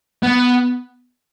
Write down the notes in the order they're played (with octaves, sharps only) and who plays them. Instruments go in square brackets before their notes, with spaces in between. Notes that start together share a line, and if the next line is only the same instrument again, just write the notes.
[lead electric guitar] B3